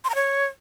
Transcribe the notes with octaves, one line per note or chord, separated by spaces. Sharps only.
C6
A#5
C#5